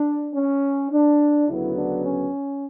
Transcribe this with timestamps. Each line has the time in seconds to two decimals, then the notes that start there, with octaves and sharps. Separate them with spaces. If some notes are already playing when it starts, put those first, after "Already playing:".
Already playing: D4
0.34 C#4
0.91 D4
1.48 D2 C#3 F#3 B3 E4
1.77 D4
2.05 C#4